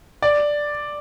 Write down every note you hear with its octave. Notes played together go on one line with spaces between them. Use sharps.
D5